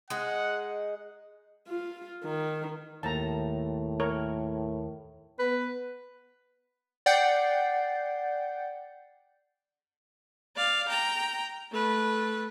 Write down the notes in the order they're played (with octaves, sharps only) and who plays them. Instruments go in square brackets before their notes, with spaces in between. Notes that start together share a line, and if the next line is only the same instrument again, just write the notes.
[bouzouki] G#3 D#4 [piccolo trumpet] F#5
[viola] F4
D#3
[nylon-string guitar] D#2 [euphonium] A2 [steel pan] A5 A#5
[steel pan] A#4 C#5
[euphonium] B3 [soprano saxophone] B4
[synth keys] D5 F#5 G5 G6 A6 C7
[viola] D5 F5
G5 A#5
A3 B4